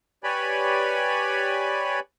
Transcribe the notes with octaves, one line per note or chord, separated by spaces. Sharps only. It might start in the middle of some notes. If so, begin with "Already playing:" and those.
G4 B4 C#5 D5 G#5 B5